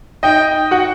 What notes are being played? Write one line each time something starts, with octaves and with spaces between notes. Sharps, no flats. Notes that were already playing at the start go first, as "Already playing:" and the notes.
D#4 D#5 G5
F#4 F#5